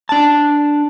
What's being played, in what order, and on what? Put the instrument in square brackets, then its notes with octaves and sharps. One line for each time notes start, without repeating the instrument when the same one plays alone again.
[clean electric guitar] D4 A5